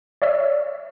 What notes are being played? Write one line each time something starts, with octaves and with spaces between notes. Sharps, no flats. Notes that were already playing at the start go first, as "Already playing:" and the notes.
C#5 D5 E5 E6